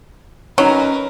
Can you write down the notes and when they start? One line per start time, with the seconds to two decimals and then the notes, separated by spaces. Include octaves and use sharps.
0.58 F#3 C#4 D#4 A#4 B4